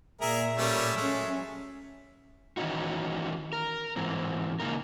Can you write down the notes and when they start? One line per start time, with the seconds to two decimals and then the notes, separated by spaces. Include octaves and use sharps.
0.21 A#2 G#4 A#4 E5 A#5
0.58 G3 A3 C#4
0.97 F#3 G#3 A3 C#4
2.57 D#3 E3 C#4 D#4 F#4
3.53 A#4
3.96 G#2 E3 C4
4.60 C#3 A#3 D#4 A#4